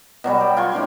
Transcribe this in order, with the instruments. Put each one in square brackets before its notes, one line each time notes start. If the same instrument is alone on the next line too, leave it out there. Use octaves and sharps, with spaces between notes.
[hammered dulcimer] B2 F#3 G3
G5
F4 G#5 C6 C#6
A2 D3 D5 D6